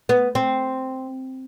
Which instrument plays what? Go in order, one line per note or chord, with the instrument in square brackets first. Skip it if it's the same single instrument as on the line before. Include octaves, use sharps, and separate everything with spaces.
[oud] B3
C4